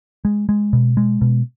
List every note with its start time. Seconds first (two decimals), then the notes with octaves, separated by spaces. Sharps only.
0.25 G#3
0.49 G#3
0.73 B2
0.97 G#3
1.21 B2